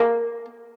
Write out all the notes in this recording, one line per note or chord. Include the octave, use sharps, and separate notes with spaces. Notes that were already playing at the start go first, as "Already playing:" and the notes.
Already playing: A#3